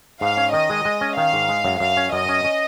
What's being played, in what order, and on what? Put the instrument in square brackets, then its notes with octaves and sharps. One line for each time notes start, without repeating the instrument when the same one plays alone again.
[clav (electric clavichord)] G#2 [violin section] F5
[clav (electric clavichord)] C#4
[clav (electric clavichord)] D#3 [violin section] D#5
[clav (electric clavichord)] G#3
G#3
C#4
[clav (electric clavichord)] D#3 [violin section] F5
[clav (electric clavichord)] G#2
G#3
F#2
[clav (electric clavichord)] F#2 [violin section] F5
[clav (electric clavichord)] C#4
[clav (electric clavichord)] F#2 [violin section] D#5
[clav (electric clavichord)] C#4
C#4